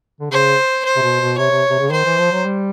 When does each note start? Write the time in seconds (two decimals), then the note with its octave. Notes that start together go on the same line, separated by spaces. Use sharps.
0.20 D3
0.31 C#3 C5
0.85 C5
0.96 C3
1.02 B2
1.21 B2
1.38 C3 C#5
1.51 C3
1.70 C3
1.79 C#3
1.91 D#3 C5
2.05 E3
2.18 F3
2.32 F#3
2.45 G3